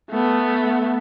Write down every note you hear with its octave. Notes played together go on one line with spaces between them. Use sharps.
A3 B3